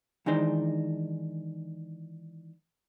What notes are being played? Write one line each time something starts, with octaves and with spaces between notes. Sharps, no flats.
D#3 E3 G#3 D4 D#4 C5